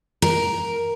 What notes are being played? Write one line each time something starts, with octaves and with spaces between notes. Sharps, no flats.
A#4